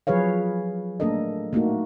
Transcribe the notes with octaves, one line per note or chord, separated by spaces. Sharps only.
F3 F#3 G#4 B4 C#5 F5
A3 A#3 D4 A4 A#4 D#5
A3 A#3 D#4 F#4